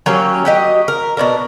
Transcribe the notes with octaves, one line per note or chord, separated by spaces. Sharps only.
F#3 A#3 C#4 G4
F#4 G4 D#5
A#4
B2 D#3 D4 A#4